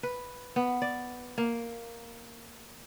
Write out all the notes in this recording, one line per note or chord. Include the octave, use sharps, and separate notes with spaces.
B4
B3
D5
A#3